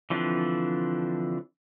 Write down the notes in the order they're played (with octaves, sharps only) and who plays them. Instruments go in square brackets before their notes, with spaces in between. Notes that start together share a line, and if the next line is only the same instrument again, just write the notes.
[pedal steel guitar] D3 E3 F3 C4 D4